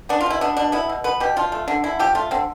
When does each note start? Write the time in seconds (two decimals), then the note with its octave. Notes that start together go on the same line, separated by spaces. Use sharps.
0.09 B3 D4
0.21 F4
0.26 B2 E4
0.41 B3 D4
0.57 B2 D4
0.72 B3 E4
0.89 B2
1.04 B3 B4
1.20 B2 G4
1.36 F3 F4
1.52 A3
1.68 D3 D4
1.84 D3 E4
1.99 F3 G4
2.15 A3 F4
2.31 D3 C4